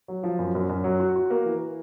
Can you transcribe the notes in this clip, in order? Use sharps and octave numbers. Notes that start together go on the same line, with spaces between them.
F#3
F3
F#2
F#2
F#2
F#3
F#4
F#4
A#3
E3